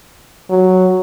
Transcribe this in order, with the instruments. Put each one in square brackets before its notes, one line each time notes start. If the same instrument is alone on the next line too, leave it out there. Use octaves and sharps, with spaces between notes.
[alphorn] F#3